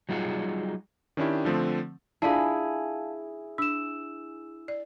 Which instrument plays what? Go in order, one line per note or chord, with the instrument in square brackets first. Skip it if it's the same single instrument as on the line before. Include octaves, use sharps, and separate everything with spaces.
[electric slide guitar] F#3 G3 D#4 F4 G#4 F#5
[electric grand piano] D#3 C#4 D4 E4 G4
D3 F3 A3 C4
[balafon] D4 F4 D5 [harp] E4 G#4 [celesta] F5 A5
[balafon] D4 [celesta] E6 E7
[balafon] D5